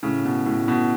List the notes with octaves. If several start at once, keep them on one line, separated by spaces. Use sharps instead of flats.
A2 C#3
B2
A2
B2